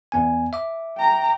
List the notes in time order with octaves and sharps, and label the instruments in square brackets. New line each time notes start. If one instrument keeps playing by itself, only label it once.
[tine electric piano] E2 B3 G#5
E5 D6
[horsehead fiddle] G5 A#5